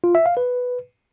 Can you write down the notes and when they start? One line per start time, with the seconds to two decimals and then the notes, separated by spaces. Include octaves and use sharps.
0.04 F4
0.15 E5
0.26 F5
0.37 B4